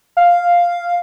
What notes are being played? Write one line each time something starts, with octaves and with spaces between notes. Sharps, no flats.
F5